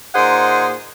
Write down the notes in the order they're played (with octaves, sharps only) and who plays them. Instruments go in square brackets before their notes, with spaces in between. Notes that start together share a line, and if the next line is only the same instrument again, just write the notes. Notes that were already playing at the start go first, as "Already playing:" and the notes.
[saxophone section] A#2 D#4 G#4 C5 F#5